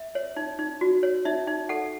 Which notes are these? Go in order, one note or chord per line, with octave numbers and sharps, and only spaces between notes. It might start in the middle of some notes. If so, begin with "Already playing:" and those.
Already playing: E5
C#5
D#4
D#4
F#4
C#5
D#4 E5
D#4
A4 F#5